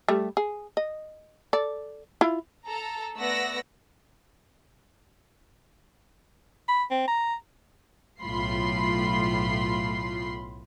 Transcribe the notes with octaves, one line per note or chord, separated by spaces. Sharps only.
G3 A3
G#4
D#5
A4 D5
E4 F4
A4 A#5
A3 B3 D5 F#5 E6 A#6
B5
C4
A#5
B1 A2 F4 B5 C6 C7